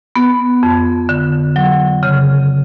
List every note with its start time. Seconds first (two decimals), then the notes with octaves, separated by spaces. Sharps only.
0.16 B3
0.63 F2
1.09 D3
1.56 F#3
2.03 C#3